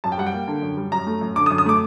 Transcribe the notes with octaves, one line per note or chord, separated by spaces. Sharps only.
F#2 A5
G5
G3 F#5
G5
A#3
D3
F#2
G3
F#2 A#5
A3
F#2
D3 D6
D#6
F#2
D#6
A3 D6